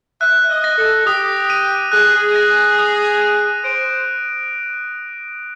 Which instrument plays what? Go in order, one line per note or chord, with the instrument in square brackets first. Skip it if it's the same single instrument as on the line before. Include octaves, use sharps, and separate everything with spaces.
[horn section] E5 [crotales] F#6
[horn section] D#5
[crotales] A#6
[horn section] A4
[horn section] G4 [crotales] D#6
[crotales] D#7
[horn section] G#4 [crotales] F#6
[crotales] A#6
D#6
D#7
[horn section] C5 [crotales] D7